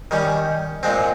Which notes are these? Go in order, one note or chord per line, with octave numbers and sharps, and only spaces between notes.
D#3 G3 C#4
A#2 G#3 C4